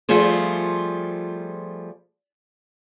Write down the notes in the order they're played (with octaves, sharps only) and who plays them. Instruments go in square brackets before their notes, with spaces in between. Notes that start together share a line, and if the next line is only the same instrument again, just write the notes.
[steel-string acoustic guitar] F3 G3 A3 F4 G#4 C5